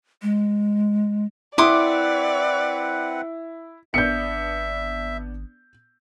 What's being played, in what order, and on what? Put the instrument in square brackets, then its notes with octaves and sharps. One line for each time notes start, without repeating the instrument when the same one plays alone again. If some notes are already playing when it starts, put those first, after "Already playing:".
[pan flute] G#3
[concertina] C4 B4 F#5 [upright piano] E4 [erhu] D5 [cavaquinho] C6 D6 D#6
[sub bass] G#1 [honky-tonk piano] B3 D4 [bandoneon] E5 [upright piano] G6 C#7